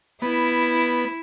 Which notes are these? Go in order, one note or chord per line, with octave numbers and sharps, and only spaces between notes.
B3 E4